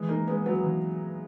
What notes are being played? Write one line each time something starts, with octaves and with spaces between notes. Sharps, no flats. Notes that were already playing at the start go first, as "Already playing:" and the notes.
Already playing: E3 G#3
A#3 D#4
G#3 B3
F#3 B3
E3